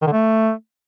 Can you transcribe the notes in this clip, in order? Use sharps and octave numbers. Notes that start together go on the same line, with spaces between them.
D#3
D3
A3